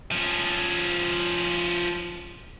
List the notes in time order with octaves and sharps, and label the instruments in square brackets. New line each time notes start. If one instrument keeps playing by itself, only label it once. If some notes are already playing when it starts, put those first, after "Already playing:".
[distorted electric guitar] F3 C#4